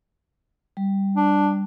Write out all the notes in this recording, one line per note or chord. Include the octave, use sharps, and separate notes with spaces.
G3
D4